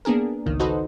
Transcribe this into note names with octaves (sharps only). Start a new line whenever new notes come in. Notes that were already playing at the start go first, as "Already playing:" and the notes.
A#3 B3 D4 G#4 A#4
G#1 C#2 D#3
D#4 F#4 A4 B4 C5 D#5